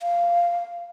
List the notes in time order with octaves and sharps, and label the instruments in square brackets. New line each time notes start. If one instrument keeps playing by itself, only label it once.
[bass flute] F5